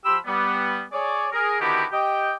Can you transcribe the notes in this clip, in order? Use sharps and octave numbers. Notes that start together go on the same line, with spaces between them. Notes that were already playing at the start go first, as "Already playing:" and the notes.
F3 G4 B5 C6 E6
G3 B3
G#4 C#5 D5
G#4 A#4
D3 D#3 B3 E4 F#4 G4
G4 D#5 G5